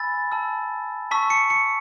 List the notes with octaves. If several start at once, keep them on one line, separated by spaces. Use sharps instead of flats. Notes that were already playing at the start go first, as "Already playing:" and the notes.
Already playing: G#5 B5 E6 A6
A5 E6
A5 C#6 E6 B6
C#7
C#7